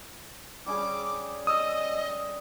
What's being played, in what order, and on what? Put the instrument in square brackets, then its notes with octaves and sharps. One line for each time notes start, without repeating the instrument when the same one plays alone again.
[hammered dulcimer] G3 C#4 G#4 [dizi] D6
[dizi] D#5 [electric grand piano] D#6 E6